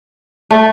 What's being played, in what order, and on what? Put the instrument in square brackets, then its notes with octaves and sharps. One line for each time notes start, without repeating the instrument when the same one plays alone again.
[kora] A3